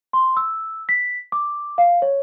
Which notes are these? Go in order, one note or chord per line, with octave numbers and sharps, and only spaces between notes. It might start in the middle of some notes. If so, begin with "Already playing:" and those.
C6
E6
B6
D6
F5
C#5